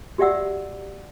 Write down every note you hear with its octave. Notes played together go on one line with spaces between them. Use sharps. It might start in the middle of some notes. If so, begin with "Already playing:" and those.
F#4 G4 D5 E5 F#5 E6